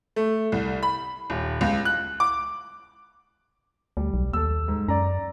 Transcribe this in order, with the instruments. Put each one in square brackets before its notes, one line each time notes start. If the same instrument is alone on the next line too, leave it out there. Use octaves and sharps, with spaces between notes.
[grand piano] A3
C2
B5
D#1
C#2
F#6
D6
[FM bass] D2 [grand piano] G3
[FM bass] B1
[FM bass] D#2 [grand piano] A4 E6
[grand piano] G#2
[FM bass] F#2 [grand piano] D5 A#5